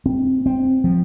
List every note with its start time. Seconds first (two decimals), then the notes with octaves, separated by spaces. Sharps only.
0.06 C4
0.46 C4
0.84 F3